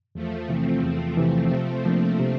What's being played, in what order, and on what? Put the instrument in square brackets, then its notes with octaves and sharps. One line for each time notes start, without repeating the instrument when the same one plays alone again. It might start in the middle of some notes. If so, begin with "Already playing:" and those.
[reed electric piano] E2 [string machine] F3 A3
[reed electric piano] C3 E3 [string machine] A3 C4
[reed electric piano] E2
C3 E3
C3
F3 A#3 D4
C3